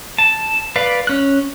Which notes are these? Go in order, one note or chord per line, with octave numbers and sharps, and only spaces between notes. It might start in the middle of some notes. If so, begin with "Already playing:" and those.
A5
B4 D5 F5
C#4 F#6